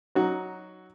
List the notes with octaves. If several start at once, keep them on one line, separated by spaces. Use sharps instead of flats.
F#3 D#4 F#4